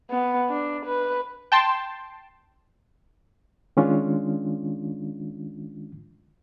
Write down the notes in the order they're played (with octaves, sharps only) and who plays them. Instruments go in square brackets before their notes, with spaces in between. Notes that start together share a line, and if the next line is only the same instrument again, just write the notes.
[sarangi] B3
D4
B4
[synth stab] G5 A5 C6
[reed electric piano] D#3 G#3 C#4 D4 F4